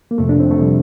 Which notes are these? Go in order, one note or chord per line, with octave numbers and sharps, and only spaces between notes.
A#3
F2 C3 F3 A3
D4
C4
A3
C3 F3 G3